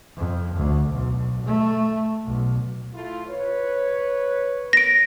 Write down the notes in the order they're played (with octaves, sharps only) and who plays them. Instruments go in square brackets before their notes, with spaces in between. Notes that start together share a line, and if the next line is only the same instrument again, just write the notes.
[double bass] F2
D2
B1
A3
B1
[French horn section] A3 E4 F4
B4 C#5
[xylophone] A#6 D7